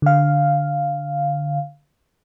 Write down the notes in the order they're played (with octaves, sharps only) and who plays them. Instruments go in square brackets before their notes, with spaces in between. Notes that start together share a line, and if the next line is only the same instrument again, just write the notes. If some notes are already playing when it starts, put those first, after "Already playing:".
[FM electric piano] D3 F5